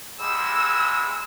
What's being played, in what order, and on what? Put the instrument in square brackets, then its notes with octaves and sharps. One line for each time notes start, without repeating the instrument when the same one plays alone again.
[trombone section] E2 G3 G#3 [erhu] E6